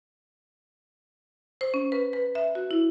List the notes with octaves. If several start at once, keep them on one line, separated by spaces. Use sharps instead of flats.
C5
C#4
B4
B4
E5
F#4
E4